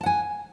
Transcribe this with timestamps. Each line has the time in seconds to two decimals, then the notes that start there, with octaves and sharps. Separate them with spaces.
0.01 A5
0.03 F#5
0.06 G#5